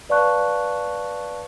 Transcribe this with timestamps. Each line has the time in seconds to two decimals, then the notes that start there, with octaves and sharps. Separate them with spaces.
0.09 B4 D5 F5 A5 C#6 F#6